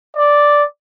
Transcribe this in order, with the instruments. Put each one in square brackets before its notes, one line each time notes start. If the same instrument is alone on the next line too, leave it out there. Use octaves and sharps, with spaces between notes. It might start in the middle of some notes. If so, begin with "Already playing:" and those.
[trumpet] D5